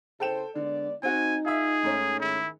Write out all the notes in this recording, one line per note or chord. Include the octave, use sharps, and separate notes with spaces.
C#3 E4 A4 C5 G5 E7
D3 G#3 B3 D5
C4 D#4 F#4 G#5
F4 G#4 E5
G#2 A3 C#4
D#3 E4 G#4